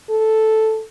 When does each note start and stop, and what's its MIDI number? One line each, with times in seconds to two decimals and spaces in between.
0.10 0.83 69